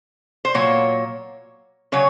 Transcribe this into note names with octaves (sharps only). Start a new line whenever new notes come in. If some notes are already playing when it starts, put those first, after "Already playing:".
C5
A#2 F#3 A#3 C#5
C#3 F#3 C#5